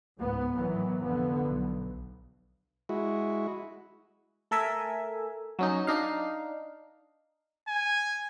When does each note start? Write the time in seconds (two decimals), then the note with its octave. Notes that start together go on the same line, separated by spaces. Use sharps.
0.17 C#2 G#2 B3
0.55 A2 D#3 E3 F#3 B3
1.03 F1 D3 F3 B3
1.48 B1
2.89 G#3 E4 F#4
4.51 A3 A4 A#4 E5 G#5
5.59 F#3 C#4 D#4
5.87 D4 D#4 F5
7.68 G#5